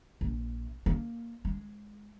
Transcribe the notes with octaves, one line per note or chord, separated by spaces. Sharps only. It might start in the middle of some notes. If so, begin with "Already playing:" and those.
A#1
A#3
G#3